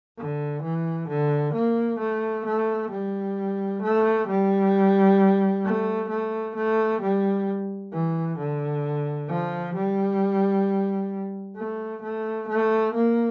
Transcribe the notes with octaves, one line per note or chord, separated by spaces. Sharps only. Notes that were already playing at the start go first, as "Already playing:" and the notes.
D3
E3
D3
A#3
A3
A3
G3
A3
G3
A3
A3
A3
G3
E3
D3
F3
G3
A3
A3
A3
A#3